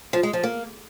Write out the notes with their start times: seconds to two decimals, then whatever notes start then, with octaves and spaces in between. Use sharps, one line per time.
0.13 F3
0.23 G#3
0.33 F3
0.43 A#3